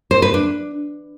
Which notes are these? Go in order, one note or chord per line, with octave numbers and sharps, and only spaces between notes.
C5
B4
D4